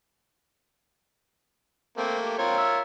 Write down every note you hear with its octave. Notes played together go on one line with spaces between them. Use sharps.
A3 A#3 C4
G4
C4 F4 A#4 C#5
E5